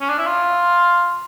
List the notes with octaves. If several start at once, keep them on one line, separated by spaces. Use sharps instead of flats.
C#4
D4
E4
F4